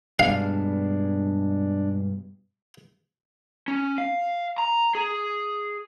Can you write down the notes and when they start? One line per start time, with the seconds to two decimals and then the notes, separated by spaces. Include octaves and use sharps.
0.19 G2 B2 G#3 D4 F5
3.68 C#4
3.98 F5
4.58 A#5
4.95 G#4